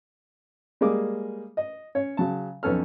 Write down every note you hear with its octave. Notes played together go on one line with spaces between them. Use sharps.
G3 G#3 A#3 G#4 D6
D#5
C#4 C#5
C#3 F#3 A5
B1 F2 B3 C#4 A4 F6